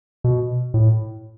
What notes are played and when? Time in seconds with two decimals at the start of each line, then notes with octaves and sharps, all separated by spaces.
0.24 B2
0.74 A2